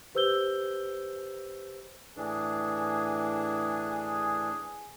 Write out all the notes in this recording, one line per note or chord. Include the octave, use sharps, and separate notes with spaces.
G4 B4 C5 E6 G6 G7
A2 E3 D4 G#4